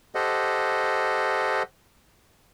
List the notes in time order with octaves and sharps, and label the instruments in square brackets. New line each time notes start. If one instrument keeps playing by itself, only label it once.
[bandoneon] G4 A4 C5 D#5 F#5